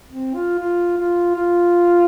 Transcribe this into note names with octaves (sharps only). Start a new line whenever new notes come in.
C4
F4
F4
F4
F4